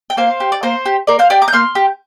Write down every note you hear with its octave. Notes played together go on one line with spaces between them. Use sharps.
G5
A#3 C5 F5
G4
D5
A#3 C5
G4
A#3 A#4 D5
C5 F5
G4 D5 G5
A#5 D6
G6
A#3 C6 F6
G4